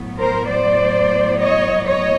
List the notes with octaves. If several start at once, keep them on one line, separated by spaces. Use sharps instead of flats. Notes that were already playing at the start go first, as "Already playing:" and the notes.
Already playing: A2 F#3 B3
A#4 C5
C5 D5
C#5 D#5
C#5 D#5